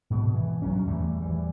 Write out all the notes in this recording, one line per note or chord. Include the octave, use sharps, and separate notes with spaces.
G#2 B2
E3
G2 F#3 C#4
E2 E3 G3 A3
E3 F3 G3